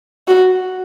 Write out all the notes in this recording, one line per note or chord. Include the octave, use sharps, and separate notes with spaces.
F#4